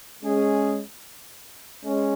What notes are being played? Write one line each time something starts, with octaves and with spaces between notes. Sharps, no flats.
G#3 C#4 G#4
G#3 C#4